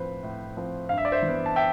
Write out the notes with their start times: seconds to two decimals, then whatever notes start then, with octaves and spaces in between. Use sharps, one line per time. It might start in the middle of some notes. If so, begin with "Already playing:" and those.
Already playing: A2 F3 C4 B4 C5
0.23 A2
0.57 F3 C4
0.89 G2 F5
0.98 E5
1.05 D5
1.12 C5 E5
1.22 E3
1.28 B3
1.46 A5
1.56 E5 G5